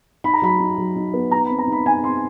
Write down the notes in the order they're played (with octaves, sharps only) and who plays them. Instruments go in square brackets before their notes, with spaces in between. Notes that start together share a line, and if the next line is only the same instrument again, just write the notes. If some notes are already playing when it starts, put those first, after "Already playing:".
[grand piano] D#4 B5
A#5
F#3 B5
D#4
F#3
D#4
B3
D#4 A#5
B5
C4
A#5
D#4 B5
D#4 G#5
C4 C6